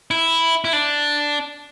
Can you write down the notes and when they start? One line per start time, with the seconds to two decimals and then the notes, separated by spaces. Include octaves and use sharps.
0.11 E4
0.65 E4
0.73 D4